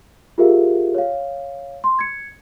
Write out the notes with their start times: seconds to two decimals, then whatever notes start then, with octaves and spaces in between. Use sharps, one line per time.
0.38 F4 G4 G#4 A#4 E5 F5
0.94 C#5 F5
1.84 C6
1.99 G#6 C#7